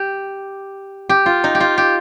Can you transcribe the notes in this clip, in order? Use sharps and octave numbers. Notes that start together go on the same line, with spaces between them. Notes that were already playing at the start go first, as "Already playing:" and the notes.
Already playing: G4
G4
F4
D#4
G4
F4
G4